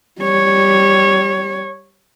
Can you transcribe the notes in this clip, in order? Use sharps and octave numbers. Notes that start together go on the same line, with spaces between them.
G3 C#5